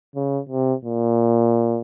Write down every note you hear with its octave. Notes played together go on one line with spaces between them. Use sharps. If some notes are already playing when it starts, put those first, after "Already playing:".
C#3
C3
A#2